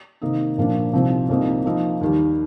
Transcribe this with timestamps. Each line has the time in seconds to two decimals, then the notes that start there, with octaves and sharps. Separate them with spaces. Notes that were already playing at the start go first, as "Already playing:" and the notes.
0.22 C3 D#3 A#3 D#4
0.58 A#2 F3 A#3 D4
0.93 C2 C3 F3 C4 D#4
1.29 C2 C3 F3 A#3 D#4
1.66 F3 A#3 D#4
2.01 D#2 D#3 G3